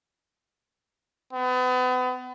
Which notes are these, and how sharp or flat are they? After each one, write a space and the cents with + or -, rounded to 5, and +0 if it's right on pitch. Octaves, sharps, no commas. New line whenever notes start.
B3 +35